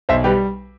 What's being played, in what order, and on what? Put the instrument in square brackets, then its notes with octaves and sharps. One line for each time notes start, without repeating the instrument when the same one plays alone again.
[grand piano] B1 C5 E5
G3 G4 B4